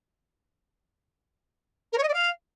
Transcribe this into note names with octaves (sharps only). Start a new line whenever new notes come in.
A#4
C#5
D#5
D5
F5